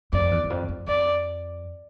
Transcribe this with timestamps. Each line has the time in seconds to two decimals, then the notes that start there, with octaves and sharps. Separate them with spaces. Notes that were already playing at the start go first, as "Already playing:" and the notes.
0.13 F2 D5
0.31 E2
0.44 E2
0.50 F2
0.68 F2
0.87 F2 D5